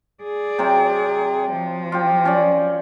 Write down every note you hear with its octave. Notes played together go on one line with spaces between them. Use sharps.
G#4 D5
C3 F#3 C4
F3
F4 G4
C#4 D5